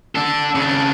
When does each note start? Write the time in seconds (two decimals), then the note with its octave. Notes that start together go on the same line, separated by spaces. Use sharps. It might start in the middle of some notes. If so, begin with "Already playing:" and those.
0.15 D4 A4
0.55 C#3 D4